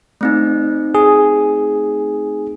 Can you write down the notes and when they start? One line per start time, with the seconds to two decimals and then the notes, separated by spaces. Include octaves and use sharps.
0.21 A3 C4 D#4
0.95 G#4